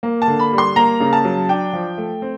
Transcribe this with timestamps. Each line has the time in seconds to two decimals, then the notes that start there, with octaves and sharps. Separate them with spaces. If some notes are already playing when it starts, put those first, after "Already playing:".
0.03 A#3
0.22 A5
0.28 D3
0.40 B5
0.52 G3
0.58 C6
0.76 A#3 A#5
1.00 C#3
1.13 A5
1.25 F#3
1.49 D4 G5
1.73 F3
1.98 A3
2.22 C4